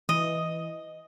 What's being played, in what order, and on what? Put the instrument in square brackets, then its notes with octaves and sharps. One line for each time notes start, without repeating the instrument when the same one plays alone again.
[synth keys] E3 [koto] D#5